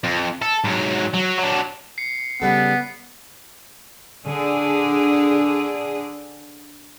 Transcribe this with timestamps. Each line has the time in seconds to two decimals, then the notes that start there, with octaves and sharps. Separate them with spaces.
0.04 F2
0.42 A4
0.64 G#2 F#3
1.14 F#3
1.39 F#3 D4
1.98 C7 C#7
2.42 C#3 G3 B3 A4 F#5
4.25 D3 D4 G#4